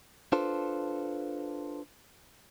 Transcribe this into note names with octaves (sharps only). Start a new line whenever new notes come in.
D4 F4 A4 B4 C5